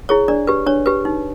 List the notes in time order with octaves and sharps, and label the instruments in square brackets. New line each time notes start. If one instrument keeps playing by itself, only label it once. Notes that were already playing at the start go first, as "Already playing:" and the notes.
[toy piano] E4 G#4 C#5
D4 D5
G4 B4
D4 C#5
G4 B4
D#4